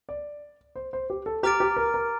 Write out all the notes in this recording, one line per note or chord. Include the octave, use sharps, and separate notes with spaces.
D5
C5
C5
G4
A4
G4 A#5 D6 F6 A6 D7
G4
A#4
A#4